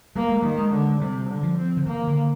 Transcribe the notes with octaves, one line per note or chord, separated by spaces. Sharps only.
G3 A#3
G#3
D#3 G3
G#3
D3
C3 G3
D3
F3
C4
D3
D#3 A#3
D3